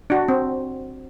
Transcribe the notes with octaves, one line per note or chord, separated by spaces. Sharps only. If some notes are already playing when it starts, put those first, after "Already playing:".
D4 F#4
C4